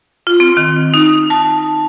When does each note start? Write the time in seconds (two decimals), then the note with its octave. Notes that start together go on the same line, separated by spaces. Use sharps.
0.27 F4
0.40 C4
0.57 D#3
0.94 D#4
1.30 A5